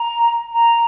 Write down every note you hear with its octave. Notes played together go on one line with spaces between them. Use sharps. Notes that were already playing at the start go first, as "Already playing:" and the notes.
Already playing: A#5
A#5